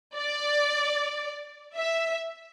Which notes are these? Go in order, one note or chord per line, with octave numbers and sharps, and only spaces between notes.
D5
E5